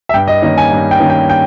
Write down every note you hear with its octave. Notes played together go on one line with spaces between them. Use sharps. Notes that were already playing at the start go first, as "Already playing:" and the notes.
E5
G2 G5
D#5
D#3 A#3 C#4 D#5
G#5
G2
G5
D#3 A#3 C#4
G5
G5